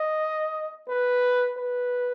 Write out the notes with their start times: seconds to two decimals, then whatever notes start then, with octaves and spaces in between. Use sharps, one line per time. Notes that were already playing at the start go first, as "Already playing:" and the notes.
Already playing: D#5
0.88 B4
1.57 B4